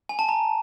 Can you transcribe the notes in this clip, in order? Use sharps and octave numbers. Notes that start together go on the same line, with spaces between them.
G#5
A5
A#5